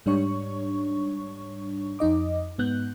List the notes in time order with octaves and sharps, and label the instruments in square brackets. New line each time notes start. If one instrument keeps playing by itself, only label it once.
[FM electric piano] G#2 G3 D4 C#5 C#6
F2 D#4 D#5 D6
G#2 B3 F#6 G6